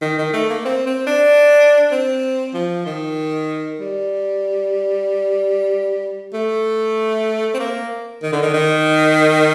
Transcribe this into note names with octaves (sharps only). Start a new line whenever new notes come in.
D#3
D#3
A3
A#3
C4
C4
D4
C4
F3
D#3
G3
A3
C4
A#3
D#3
D3
D#3
D#3